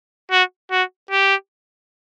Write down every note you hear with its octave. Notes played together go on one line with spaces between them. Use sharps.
F#4
F#4
G4